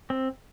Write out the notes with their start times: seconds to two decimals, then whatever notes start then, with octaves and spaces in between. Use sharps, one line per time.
0.10 C4